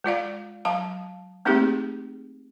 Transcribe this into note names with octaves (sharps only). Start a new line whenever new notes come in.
G#3 F4 D5 F5
F#3 F5 A5
A3 A#3 C4 D#4 G4 G#4